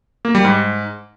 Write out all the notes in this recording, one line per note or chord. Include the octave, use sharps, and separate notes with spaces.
A#3
G3
G#2